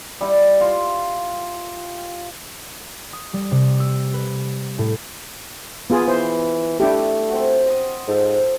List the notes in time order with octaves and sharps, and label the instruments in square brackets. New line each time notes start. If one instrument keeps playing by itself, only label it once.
[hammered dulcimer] G3 E4
F4
[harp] D#6
G3
C3
E6
B4
A2
[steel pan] B3 F4 G#4
[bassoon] E3 [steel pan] C5 [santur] B5
[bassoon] A3 [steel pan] D4 E4 G4
[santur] C4 F#4
D#5 C6 D#6
[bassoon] G#2 [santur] F3 A4